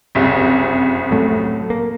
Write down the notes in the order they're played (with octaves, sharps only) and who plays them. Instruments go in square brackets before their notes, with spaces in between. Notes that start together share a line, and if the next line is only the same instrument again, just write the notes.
[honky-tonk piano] F#1 C2 F2
[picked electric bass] A2 F#3 A3
A#3